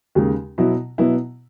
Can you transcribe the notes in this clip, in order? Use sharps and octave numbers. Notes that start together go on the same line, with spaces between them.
D#2 C#3 G#3
B2 F#3 B3 E4
B2 F#3 B3 E4